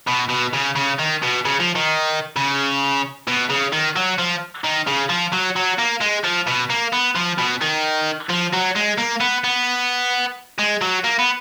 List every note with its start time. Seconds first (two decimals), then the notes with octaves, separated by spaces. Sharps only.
0.08 B2
0.30 B2
0.54 C#3
0.76 C#3
0.99 D#3
1.22 B2
1.45 C#3
1.60 F3
1.75 D#3
2.37 C#3
3.28 B2
3.50 C#3
3.73 D#3
3.96 F#3
4.18 F3
4.64 D#3
4.87 C#3
5.09 F3
5.33 F#3
5.56 F#3
5.79 A#3
6.01 G#3
6.24 F3
6.47 B2
6.70 A#3
6.93 B3
7.15 F3
7.39 B2
7.62 D#3
8.29 F3
8.53 F#3
8.76 G#3
8.98 A#3
9.21 B3
9.44 B3
10.58 G#3
10.81 F#3
11.04 A#3
11.19 B3